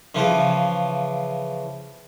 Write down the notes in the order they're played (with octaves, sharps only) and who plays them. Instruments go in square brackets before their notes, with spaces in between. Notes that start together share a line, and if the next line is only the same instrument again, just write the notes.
[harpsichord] C#3 E3 F3 C4